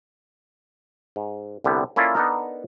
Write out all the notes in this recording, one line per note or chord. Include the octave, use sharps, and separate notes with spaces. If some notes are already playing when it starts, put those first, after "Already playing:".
G#2
C2 D3 G3 B3
A#3 C#4 E4 F4 A4 D5
B3 D4 D#4 A4 A#4